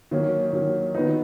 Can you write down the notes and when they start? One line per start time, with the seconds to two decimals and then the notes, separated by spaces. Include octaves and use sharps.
0.11 D#3 F#3 A#3 C#4
0.53 D#3 F#3 A#3 C#4
0.95 D#3 F#3 B3 D#4